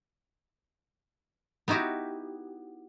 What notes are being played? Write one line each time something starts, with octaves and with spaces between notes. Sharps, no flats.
B3 D#4 E4 F#4 G4